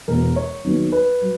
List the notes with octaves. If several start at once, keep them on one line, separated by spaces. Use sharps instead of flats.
E1 E2 B2 A#4
C#5
D#2 D#3 F#3 B3
B4
F#3